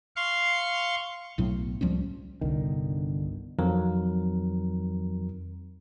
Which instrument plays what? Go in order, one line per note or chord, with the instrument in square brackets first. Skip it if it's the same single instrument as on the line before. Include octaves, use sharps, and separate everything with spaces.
[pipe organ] F5 C6 C#6
[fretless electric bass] B1 A2 F#3 B3
C#2 F3 G3 C#4
[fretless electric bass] G1 D#3 [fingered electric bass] C2 [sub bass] D3
[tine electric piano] F2 D#3 F#3 A#4